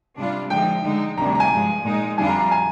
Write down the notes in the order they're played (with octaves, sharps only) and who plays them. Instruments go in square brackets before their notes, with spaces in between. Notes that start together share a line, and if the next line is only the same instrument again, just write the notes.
[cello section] C3 G3 D4 F4
[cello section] D3 F3 G#3 D#4 [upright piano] G5
[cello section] D3 G#3 D#4
[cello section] D2 C3 D#3 G3 D4 [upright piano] A#5
[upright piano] A#5
G#5
[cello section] G2 F3 G#3
A#2 G#3 D#4
[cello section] F2 D3 G3 D4 F4 [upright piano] G#5
[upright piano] A#5
A#5
G#5